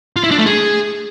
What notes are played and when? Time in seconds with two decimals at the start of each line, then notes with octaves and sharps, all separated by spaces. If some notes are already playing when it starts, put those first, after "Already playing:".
0.16 F4
0.24 E4
0.31 D4
0.39 A3
0.46 G#4